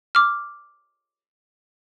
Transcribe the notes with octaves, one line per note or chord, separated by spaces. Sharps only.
D6 F6